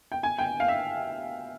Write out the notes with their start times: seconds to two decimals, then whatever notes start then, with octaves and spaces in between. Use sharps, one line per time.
0.12 G5
0.23 G#5
0.38 G5
0.60 F5
0.68 E5